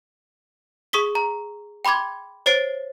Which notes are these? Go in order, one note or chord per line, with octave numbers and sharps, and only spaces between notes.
G#4 C#6 D#6 B6 G7
A#5
G5 B5 C6 D6 G#6
C5 C#5 A6 C7 D7